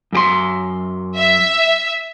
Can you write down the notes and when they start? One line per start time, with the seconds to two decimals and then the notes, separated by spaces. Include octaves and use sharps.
0.12 F#2 G4 C6
1.16 E5